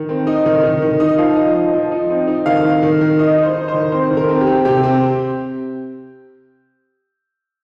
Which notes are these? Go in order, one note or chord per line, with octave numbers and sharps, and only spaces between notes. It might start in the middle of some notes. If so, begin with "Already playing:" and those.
Already playing: D#3
C4
D#4 D#5
D#3
D#3
D#3
D#4 D#5
F3 F5
D#4 D#5
F3 D#5
F3
D#4
C4
D#4
D#3 F5
D#3
D#3
D#3
D#4 D#5
D#4
C5
D#4
C5
D#3
C4 C5
D#3
A#4
C4
G4
C4
C3 G4
C4